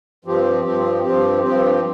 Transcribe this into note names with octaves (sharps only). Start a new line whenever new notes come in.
G2 F3 C4 G4
G2 F3 C4 G4
G2 F3 C4 G4
G2 F3 C4 G4